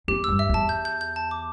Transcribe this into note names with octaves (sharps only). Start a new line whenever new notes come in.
E2 G4
G2 E6
E5
E2
A5
G6
G6
G6
A5
D6